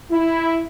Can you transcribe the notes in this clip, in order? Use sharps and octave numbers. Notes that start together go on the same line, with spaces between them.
E4